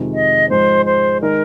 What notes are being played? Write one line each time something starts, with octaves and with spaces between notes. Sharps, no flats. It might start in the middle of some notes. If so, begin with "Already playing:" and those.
Already playing: F2 C3 D#3 G#3
D#5
G#2 F3 G#3 C5
C5
D#3 G#3 D#4 A#4